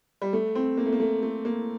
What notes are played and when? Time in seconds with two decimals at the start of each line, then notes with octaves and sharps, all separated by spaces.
0.22 G3
0.33 A3
0.55 C4
0.78 A#3
0.86 A3
0.92 A#3
1.00 A3
1.23 A3
1.45 A#3